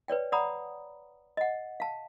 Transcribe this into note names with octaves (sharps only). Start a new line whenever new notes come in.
B4 C#5 D5 G5
D5 F#5 A#5 B5 D#6
D#5 F#5
F5 A5